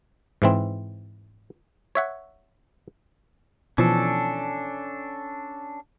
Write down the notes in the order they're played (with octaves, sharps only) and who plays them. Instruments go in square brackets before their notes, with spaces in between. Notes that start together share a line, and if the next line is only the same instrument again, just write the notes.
[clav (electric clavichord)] G#2 E3 C4
C#5 E5 F#5
[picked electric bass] B2 E3 F3 [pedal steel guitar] C#4 D4 A4